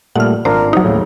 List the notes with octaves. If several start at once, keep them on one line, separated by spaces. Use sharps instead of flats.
A#2 G3 A3 F#5 F6
G#1 D4 F4 A#4 C5
C3 F#3 D#4
D#2 A2 C#3